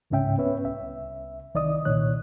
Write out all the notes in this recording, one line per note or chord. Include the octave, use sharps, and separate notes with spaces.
C#2 G#2 C#3 C#4 E5 G5
B3 C#4 B4 C#5 E5
C2 E5
C2 D#3 D5 D#5 D#6
C2 A#2 D#3 C#5 F#6